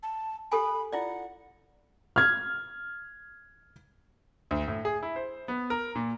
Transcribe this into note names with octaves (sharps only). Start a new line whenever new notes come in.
A5
G4 A4 G#5 B5
E4 F4 D5 F#5
F6 G#6
D2
A2
G#4
E4
C5
B3
A#4
A#2